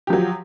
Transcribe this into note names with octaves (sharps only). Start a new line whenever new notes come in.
F3 F#3 G4